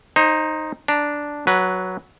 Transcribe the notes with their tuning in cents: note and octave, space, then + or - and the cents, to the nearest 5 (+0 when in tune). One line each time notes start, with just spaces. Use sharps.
D#4 +0 C5 +25
D4 -5 A#5 +5
F#3 +0 B4 -10